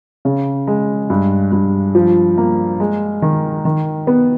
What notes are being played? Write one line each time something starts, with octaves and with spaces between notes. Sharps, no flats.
C#3
G#3
G2
G2
F3
A#3
G#3
D#3
D#3
B3